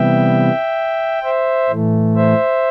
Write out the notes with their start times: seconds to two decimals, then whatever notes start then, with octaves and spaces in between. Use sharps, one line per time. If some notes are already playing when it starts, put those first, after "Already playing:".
Already playing: C3 E3 G3 B3 E5 G5
1.23 C5 E5
1.70 A2 E3 A3
2.16 C5 E5